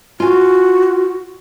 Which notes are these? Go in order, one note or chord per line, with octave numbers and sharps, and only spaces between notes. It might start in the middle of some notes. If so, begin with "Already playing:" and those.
F4 F#4 G#5